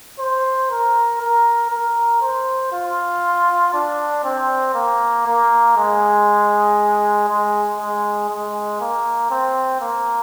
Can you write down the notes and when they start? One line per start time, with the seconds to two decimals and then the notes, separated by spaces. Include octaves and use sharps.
0.19 C5
0.71 A#4
1.21 A#4
1.71 A#4
2.22 C5
2.73 F4
3.74 D4
4.24 C4
4.74 A#3
5.26 A#3
5.77 G#3
7.28 G#3
7.79 G#3
8.30 G#3
8.80 A#3
9.31 C4
9.81 A#3